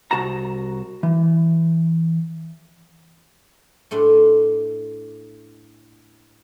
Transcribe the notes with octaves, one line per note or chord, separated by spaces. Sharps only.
C2 F#4 A5 A#5
E3
A2 A3 D4 C6